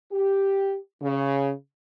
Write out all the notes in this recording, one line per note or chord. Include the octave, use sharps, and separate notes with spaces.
G4
C#3